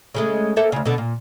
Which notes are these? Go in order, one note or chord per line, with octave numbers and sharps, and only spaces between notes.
C#3 G#3 A3
A#3 A4 E5
D2 C#3
B2 D3
A#2